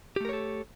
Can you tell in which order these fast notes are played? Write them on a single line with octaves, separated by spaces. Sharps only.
G4 A3 A#4 C#5 A4